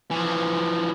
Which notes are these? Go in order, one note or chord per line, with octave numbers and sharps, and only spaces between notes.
E3 F3